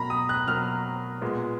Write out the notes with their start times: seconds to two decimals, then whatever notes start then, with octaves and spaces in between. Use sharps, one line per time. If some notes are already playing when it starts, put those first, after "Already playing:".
Already playing: B2 F#3 A#3 A#5 B5
0.10 D#6
0.29 F#6
0.47 B2 F#3 A#3 F6
1.22 A#2 G#3 B3